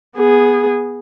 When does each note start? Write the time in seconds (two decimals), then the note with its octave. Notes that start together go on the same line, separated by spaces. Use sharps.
0.16 B3 G#4